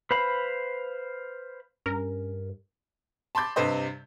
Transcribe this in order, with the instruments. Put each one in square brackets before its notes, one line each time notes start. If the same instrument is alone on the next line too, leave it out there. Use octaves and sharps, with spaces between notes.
[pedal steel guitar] B4 C5 F5 B5
[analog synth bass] G2 [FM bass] C#4 [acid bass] A#4
[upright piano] A5 B5 C6 D6 G6 A6
G2 C3 B4 C5 D#5